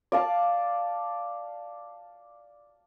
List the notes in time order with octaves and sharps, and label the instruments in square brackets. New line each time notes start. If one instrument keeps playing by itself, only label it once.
[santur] D5 F5 A5